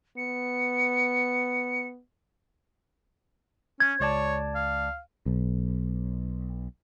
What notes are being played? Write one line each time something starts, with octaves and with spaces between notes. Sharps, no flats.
B3 C#7
C#4 G#6
C#2 C#5 D5 A5
F5
B1